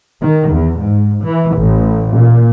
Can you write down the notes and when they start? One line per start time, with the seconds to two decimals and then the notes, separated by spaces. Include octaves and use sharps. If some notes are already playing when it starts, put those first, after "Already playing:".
0.21 D#3
0.55 E2
0.84 G#2
1.23 E3
1.56 A1
2.15 A#2